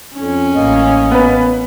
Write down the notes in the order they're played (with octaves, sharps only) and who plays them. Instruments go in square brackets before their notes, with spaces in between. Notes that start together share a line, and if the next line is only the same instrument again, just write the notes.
[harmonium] F2 [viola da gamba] C#4
[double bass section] A1 [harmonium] A#3 D#5
[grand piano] B3 B4